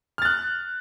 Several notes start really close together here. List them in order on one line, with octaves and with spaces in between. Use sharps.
F6 A6 F#6